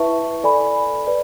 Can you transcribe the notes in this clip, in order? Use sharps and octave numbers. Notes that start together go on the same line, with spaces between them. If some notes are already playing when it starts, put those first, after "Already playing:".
Already playing: E4 B4 E5 A5 C#6
A4 D5 G#5 B5
B4 D5